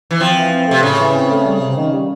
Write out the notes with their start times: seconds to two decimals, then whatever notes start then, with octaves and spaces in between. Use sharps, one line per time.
0.11 E3
0.21 F3 C4
0.36 E3
0.52 C4
0.68 C3 A3
0.83 A2 C#3
0.99 E3
1.14 C4
1.29 A3
1.46 G3
1.61 C3
1.76 D#3
1.92 G3